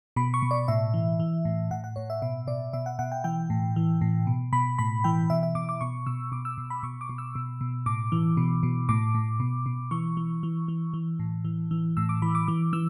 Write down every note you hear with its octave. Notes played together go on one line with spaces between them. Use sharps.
B2 B5
C#6
B2
D5
A2 E5
E3
E3
A2
A2 F#5
F#5
A2 C#5
E5
B2 E5
B2 D5
B2 E5
F#5
B2 F#5
G5
E3 G5
A2
E3
A2
B2
B2 B5
A2 B5
E3 G5
B2 E5
E5
B2 D6
D6
B2 C#6
B2 E6
B2 D6
E6
B2
B5
B2 C#6
D6
B2
E6
B2
B2
A2 D6
E3
B2
B2
A2 D6
A2
B2
B2
E3 C#6
E3
E3
E3
E3
A2
E3
E3
A2 E6
D6
E3 B5
D6
E3 D6
E3 E6